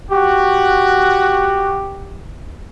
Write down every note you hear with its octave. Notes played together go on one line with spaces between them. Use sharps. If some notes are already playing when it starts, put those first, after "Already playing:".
F#4 G4